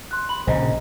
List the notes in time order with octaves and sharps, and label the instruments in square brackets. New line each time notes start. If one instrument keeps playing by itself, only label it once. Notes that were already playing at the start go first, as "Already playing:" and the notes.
[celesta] C6 F#6
B5 F#7
[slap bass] A#1 C#3 [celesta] C5 D#5 A#5